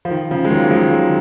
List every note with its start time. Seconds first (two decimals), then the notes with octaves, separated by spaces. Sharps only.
0.05 F3
0.11 D#3
0.31 C#3 F3
0.45 G#3
0.50 D#3 F#3
0.64 A#3
0.70 F3 G#3
0.90 D#3 F#3